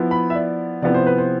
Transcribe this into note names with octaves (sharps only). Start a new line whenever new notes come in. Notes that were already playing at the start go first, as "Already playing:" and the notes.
Already playing: F3 B3 E4
B5
E5
D5
C3 F3 B3 E4 D5
C5
B4
C5